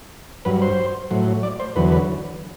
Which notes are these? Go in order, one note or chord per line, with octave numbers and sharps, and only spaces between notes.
G2 F#3 B4
C5
A2 F#3
D5
C5
E2 D3 F#3 B4
B4